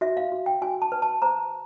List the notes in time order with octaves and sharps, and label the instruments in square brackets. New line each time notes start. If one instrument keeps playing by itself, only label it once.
[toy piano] F#4 E5
F5
F#4
G5
F#4 G#5
A5
B4
A5
C5 A#5